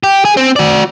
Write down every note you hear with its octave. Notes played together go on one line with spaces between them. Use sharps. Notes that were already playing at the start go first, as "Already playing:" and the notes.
G4
G#4
C4
F#4 D5